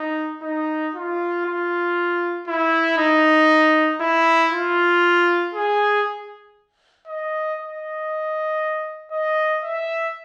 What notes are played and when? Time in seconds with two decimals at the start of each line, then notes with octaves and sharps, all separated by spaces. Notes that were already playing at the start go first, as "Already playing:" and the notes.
Already playing: D#4
0.42 D#4
0.94 F4
1.45 F4
2.47 E4
2.98 D#4
4.01 E4
4.52 F4
5.54 G#4
7.07 D#5
7.59 D#5
9.12 D#5
9.63 E5